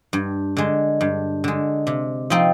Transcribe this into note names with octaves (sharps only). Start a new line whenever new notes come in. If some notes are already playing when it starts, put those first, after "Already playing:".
G2
D3 G#3
G2
D3 G#3
C3
F3 C4 D#4